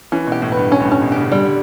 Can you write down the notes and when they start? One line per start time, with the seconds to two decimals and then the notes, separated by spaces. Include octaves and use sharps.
0.12 E3 C#4
0.27 B2
0.32 G4
0.42 A2
0.52 G2 B4
0.72 C#4
0.80 G2
0.86 A2
0.92 C#4
1.02 B2
1.12 C#3 G4
1.32 D3 G3